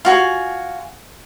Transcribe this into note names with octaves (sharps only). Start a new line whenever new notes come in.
F4 F#4 G#5